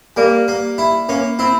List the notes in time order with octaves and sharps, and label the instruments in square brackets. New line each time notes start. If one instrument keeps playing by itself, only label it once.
[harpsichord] G3 [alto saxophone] A#3
[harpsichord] A#3
E4
[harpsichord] A#3 [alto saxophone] C#4
[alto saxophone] C4 [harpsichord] E4